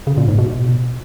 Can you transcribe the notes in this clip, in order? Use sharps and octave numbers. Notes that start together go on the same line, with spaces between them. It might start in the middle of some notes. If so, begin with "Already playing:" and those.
C#3
A#2
G#2
B2